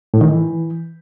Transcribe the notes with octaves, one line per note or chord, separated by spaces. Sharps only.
A2
D#3
E3